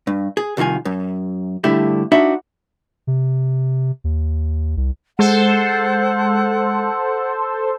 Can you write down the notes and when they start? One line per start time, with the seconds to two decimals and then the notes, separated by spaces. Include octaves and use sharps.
0.07 G2
0.37 G#4
0.57 C2 F2 D#3 F4 G#5
0.85 F#2
1.64 G2 D3 A3 E4 G4
2.12 D4 D#4 F#4 E5 B5
3.07 C3
4.04 D#2
4.77 C2
5.19 G#3 A4 C5 F#5